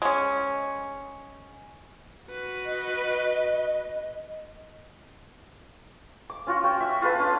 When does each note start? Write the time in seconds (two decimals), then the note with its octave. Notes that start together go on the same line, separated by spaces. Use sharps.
0.02 G#3 C#4
2.28 F#4 B4
2.66 D#5
6.30 D6
6.47 C#4 F4 F#4
6.64 C#4 F#4 G5
6.80 E5
7.02 F4 A4 B4 A5
7.20 C#4 D4